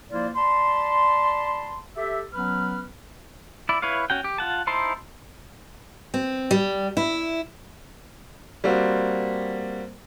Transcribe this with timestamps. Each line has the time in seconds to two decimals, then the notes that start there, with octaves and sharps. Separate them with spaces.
0.11 F3 A#3 E4 F4 C5 D5
0.36 D5 A5 B5 C6
1.96 G4 A4 E5
2.33 F#3 B3 C#4 B4 F6
3.69 E4 D5
3.82 E4 B4 C#5 F5
4.10 C#4 F#4 G5
4.24 G4
4.38 F4 F#5 A5
4.67 D#4 E4 C5 A5 C6
6.14 C4
6.51 G3
6.97 E4
8.64 G3 A#3 C4 F#4